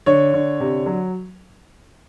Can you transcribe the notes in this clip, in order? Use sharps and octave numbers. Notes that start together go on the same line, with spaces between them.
D3 C#5
D3
C3
F#3